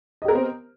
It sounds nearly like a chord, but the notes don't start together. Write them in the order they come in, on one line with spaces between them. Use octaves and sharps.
D#5 G4 A#4 B3 C4